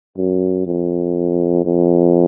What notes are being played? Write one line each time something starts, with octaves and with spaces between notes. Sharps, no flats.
F#2
F2
F2